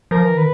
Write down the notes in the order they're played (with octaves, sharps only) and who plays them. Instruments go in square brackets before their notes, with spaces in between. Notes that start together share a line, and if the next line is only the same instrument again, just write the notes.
[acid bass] F3 [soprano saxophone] A#4
[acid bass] E3
[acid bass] D#3 [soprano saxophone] B4